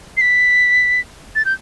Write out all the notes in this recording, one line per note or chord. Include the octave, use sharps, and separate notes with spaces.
C7
B6
A6
G6